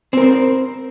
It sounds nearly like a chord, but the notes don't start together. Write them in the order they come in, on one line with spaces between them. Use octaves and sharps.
C4 A#4 C5